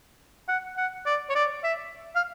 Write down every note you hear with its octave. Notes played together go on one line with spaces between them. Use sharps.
F#5
F#5
D5
C#5
D5
E5
F5